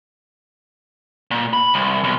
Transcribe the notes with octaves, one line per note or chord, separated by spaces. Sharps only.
A#2
B5
C2
B1